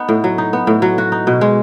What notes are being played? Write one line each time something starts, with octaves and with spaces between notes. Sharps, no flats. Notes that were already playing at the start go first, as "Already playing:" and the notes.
Already playing: B3 D#4
A2
F#3
D#4
B3
A2
F#3
F#4
D#4
B2
G#3